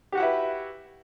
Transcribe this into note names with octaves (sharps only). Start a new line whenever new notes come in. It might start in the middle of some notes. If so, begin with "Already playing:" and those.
E4 F#4 G4 B4 F#5